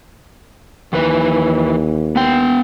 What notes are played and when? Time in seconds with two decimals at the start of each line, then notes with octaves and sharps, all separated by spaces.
0.93 D#2 D#3 E3 B4
2.16 B3 G5